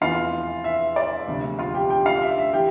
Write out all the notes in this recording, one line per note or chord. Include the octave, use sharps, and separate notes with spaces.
F1 E2 E3 F4 F5
E5
D5
E1 D2 C3 F3
F4 F5
G4 G5
G4 G5
F4 F5
E5
E5
E3 G4 G5